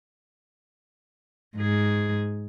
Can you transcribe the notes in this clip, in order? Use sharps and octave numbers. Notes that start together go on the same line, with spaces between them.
G#2 G#4